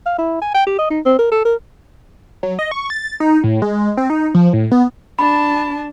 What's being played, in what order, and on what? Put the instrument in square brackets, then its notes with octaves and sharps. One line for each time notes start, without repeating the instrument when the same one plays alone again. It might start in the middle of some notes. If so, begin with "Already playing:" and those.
[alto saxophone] F5
E4
G#5
G5
G4
D#5
D#4
C4
A#4
A4
A#4
[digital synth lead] F#3
D#5
C#6
A6
D#4
A2
G#3
C4
D#4
F3
A2
B3
[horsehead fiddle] D4 A5 [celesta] B5